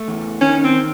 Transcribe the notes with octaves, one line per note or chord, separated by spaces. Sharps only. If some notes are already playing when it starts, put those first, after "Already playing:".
Already playing: A3
E2
D#3 C#4
C4